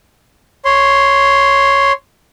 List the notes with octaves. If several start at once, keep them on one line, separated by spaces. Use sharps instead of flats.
C#5 C6